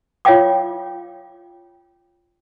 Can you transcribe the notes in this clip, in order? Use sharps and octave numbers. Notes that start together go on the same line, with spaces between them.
F4 C#5 E5 F5 G5 D6